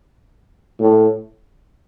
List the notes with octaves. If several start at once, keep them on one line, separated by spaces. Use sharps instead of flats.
A2